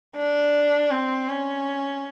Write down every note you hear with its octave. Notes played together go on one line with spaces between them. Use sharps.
D4
C4
C#4